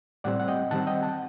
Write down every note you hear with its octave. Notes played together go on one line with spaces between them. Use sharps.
A2 G3 C4 D5 F#5
F#5
D#5 G5
D#3 G3 C4 F#5 A5
D#5 G5
F#5 A5